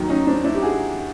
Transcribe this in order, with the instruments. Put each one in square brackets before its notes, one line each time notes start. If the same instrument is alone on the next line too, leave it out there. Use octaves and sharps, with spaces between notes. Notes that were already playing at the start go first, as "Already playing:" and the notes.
Already playing: [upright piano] D#2 D#3 F#3
C#4 D#4
C4 D4
D4 E4
G4
F#4 G#4